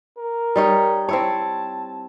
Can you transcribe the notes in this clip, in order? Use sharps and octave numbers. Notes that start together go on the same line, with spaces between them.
A#4
G3 D#4 C#5
C4 E4 C#5 A5